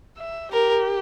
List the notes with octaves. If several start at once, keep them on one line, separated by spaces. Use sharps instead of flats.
E5
G4 A#4